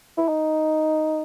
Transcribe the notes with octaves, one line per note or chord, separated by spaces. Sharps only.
E4
D#4